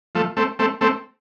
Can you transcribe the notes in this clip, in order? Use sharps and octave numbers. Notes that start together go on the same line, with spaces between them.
F3 A3
A3 C4
A3 C4
A3 C4